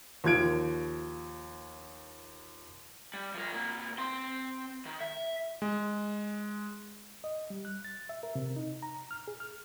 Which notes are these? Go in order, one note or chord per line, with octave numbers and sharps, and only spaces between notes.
D#2 F3 G#6 D7
G3
F3 A#4
C3 A#3
C4 C6
D#3
E5
G#3
D#5
G3
F#6
A6
E5
A#4
C3
D#4
A#5
F6
G#4
F6